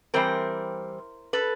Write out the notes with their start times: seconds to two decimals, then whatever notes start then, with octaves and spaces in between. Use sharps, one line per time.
0.14 E3 G3 C4 A#4 C5
1.33 A4 B4